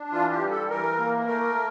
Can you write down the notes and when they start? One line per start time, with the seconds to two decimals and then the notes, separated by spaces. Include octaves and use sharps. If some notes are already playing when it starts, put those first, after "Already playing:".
Already playing: D4
0.12 E3 F4
0.31 G4
0.40 G3
0.50 A4
0.69 E3 A#4
0.98 A#3
1.27 A3 A#4